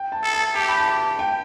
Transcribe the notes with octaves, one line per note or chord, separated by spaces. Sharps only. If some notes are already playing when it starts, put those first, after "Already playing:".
Already playing: G5
A5
A4
A5
G4 A5
B5
A5
G5